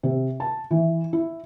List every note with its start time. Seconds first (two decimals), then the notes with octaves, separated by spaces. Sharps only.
0.03 C3
0.40 A5
0.71 E3
1.13 E4